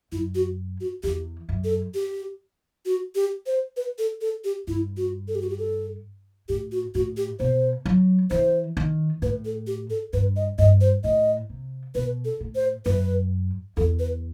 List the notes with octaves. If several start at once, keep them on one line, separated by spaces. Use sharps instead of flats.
F#2 E4
F#4
F#4
E2 G4
F#2
A4
G4
F#4
G4
C5
B4
A4
A4
G4
G2 E4
F#4
A4
G4
F#4
G4
A4
A2 G4
F#4
A2 F#4
G4
B2 C5
F#3
E3 C5
D#3
A2 B4
A4
G4
A4
G2 B4
D#5
G2 D#5
C5
A2 D#5
C3
B2 B4
A4
A2
C5
F#2 B4
E2 A4
B4